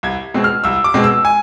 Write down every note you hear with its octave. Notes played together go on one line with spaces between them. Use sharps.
C2 G#6
B2 G#3 C4
F6
C2 E6
D6
B2 G#3 C4
E6
G#5